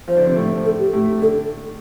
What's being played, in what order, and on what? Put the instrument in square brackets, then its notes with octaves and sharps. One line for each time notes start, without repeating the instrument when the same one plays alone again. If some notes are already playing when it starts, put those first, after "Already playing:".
[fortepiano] F3 F4 [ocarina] C5
[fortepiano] D3 D4
C3 C4
A2 A3
[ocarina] A4
G4
[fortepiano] A2 A3
[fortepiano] D3 D4 [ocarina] A4